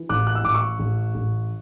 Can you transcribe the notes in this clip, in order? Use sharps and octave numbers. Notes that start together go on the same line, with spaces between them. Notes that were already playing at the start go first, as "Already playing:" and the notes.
Already playing: E3
A1 D6 F#6
F#6
E6
A1 D6
C#6 E6
A1
A1